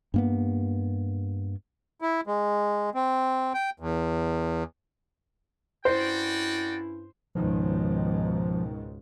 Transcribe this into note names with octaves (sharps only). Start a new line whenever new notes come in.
G2 A#3 B3
E4
G#3
C4
G5
E2
G2 C#4 E4 F#4 C5 D5 G5
C#2 G#2 B2 D#3 F3